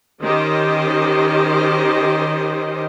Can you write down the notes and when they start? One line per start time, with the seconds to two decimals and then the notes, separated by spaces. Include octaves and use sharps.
0.22 D#3 C#4 G4 C5 D#5